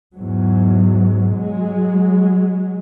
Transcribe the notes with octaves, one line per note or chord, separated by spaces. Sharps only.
E2 G#2 F#3
F#3 G#3